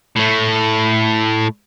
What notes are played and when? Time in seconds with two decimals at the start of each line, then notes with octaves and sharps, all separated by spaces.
0.16 A2 A3